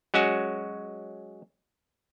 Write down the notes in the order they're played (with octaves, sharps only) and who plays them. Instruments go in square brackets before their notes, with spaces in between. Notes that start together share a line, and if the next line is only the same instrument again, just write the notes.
[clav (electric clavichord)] F#3 G#3 C#4 F#4